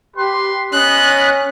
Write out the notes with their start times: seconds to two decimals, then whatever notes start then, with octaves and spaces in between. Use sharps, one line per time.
0.16 G4 B4 C6
0.73 B3 C#4 D#5 F#6